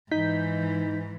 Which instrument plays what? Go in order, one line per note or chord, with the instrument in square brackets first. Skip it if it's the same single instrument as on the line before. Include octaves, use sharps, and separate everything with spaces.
[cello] G#2 E3 [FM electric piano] D#4 G6 B6